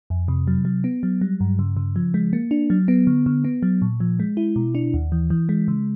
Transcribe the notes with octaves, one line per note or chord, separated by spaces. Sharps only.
F2
C3
F#3
F#3
B3
F#3
G3
G2
C#3
C#3
F3
G#3
A#3
D4
F#3
B3
D3
D3
B3
F#3
A#2
F3
G#3
E4
B2
D4
D#2
E3
E3
G#3
C#3